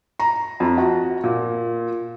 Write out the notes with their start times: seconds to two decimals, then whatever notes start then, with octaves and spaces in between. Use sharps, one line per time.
0.19 A#5
0.60 F2
0.78 F#4
1.24 A#2